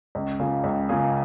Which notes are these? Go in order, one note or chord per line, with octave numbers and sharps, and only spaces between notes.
C#2
C#3 A#3 F4 G#4
C#2
C#3 A#3 F4 G#4